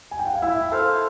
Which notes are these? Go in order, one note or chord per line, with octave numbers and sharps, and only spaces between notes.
G#5
G5
F#5
F5
E4 E5
A4 C5 F5